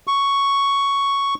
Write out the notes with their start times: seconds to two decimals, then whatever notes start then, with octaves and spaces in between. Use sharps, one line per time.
0.07 C#6